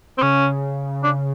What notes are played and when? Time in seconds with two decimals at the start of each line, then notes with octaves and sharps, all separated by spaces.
0.18 C4
0.22 C#3 C#4
1.03 D4